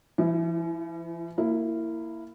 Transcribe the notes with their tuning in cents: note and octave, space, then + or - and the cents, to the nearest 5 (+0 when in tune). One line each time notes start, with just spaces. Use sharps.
E3 +45 E4 +0
A#3 -20 E4 +0